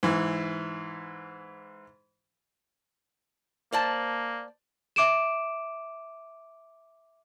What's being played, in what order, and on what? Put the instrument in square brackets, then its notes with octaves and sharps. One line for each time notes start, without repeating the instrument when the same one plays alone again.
[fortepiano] G#2 E3
[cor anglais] A#3 [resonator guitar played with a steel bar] C5 D5 A5
[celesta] E5 D6 D7 E7